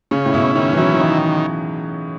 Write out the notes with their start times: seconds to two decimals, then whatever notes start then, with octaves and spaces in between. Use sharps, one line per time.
0.11 C#3 C#4
0.25 A2
0.33 B2 E4
0.55 D#3 C#4
0.73 E3
0.77 F#3 E4
0.94 E3
1.00 D#3